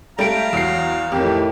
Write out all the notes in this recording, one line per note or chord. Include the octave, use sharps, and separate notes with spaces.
G3 A3 F5 A#5 D7
E2 F#3 C7
F2 A2 D#3 G4